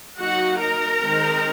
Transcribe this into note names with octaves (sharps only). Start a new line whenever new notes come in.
F#3 A#3 D#4 F#4 F#5
A#4 A#5
D#3 G#3 C4 D#4